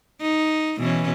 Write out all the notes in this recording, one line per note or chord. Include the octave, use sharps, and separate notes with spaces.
D#4
B2 E3 C#4